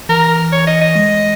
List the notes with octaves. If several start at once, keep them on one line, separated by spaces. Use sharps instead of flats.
E3 A#4
C#5
D#5
D#5
G#3